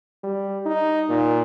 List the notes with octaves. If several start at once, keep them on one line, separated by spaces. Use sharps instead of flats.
G3
D#4
A#2